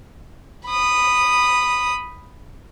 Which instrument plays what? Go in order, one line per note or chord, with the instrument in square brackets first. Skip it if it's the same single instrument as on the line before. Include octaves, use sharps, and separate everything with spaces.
[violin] B5 D#6